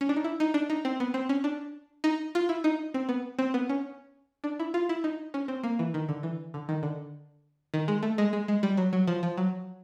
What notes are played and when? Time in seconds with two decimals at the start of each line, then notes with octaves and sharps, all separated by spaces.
0.01 C#4
0.09 D4
0.16 D#4
0.24 E4
0.40 D#4
0.54 D4
0.70 D#4
0.85 C4
1.00 B3
1.14 C4
1.29 C#4
1.44 D4
2.04 D#4
2.35 F4
2.49 E4
2.64 D#4
2.94 C4
3.09 B3
3.39 C4
3.54 B3
3.69 C#4
4.44 D4
4.60 E4
4.74 F4
4.89 E4
5.04 D#4
5.34 C#4
5.48 C4
5.63 A#3
5.79 E3
5.94 D#3
6.09 D3
6.23 E3
6.54 D3
6.69 D#3
6.83 D3
7.74 D#3
7.88 G#3
8.03 A3
8.18 G#3
8.33 G#3
8.48 G#3
8.63 G3
8.77 F#3
8.93 F#3
9.08 F3
9.23 F3
9.38 F#3